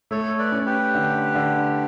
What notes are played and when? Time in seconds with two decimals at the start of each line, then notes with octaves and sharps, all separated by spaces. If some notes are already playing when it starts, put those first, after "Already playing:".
0.11 A3 A4 C#5
0.39 B4 D5
0.52 C#4
0.66 G4 B4
0.95 D3
1.35 D3